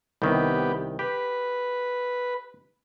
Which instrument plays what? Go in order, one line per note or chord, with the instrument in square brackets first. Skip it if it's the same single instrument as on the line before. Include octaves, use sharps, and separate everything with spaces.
[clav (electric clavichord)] C2 D#3 [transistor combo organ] B3 G4
[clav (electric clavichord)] G4 [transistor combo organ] B4